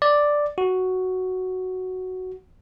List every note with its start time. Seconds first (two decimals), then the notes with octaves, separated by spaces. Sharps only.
0.02 D5
0.58 F#4